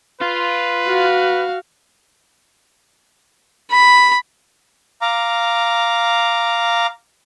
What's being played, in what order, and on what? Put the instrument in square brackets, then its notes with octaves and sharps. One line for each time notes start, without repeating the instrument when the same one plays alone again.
[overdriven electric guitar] F4 [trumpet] B4
[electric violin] F#4 F5
[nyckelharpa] B5
[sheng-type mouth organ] F5 A#5 D6